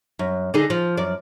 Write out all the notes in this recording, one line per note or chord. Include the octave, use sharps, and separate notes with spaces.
F#2
D3 D#4 G#4
F3
F#2 D5